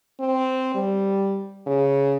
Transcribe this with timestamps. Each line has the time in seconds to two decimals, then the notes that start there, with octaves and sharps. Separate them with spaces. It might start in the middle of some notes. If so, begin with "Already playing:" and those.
0.20 C4
0.75 G3
1.67 C#3